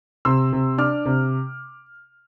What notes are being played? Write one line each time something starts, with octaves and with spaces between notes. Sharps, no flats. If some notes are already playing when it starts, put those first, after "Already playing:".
C3 C6 E6
C3
D4 D6 F6
C3